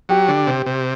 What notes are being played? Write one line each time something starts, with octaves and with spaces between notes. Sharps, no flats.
F#3 G4
D3
C3
C3